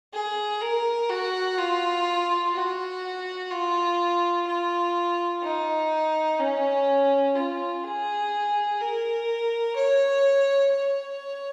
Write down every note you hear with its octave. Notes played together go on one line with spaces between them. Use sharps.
G#4
A#4
F#4
F4
F#4
F4
F4
D#4
C#4
F4
G#4
A#4
C#5
C#5